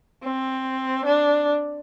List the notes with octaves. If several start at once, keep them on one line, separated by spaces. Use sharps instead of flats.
C4
D4